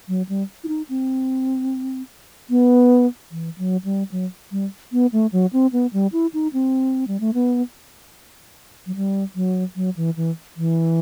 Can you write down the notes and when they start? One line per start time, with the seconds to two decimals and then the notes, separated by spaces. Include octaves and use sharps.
0.08 F#3
0.29 G3
0.64 E4
0.68 D#4
0.89 C4
2.50 B3
3.31 E3
3.58 F#3
3.84 G3
4.11 F#3
4.52 G3
4.92 B3
5.12 A3
5.32 F#3
5.53 C4
5.73 B3
5.93 G3
6.13 E4
6.34 D#4
6.53 C4
7.08 G3
7.20 A3
7.34 B3
8.86 F#3
8.96 G3
9.35 F#3
9.76 F#3
9.96 E3
10.16 E3
10.57 E3